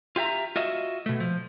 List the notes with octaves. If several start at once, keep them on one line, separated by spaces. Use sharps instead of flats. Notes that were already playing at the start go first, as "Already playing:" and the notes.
F4 G4 E5 A#5
F4 F#4 D#5 E5
B2 A3
F3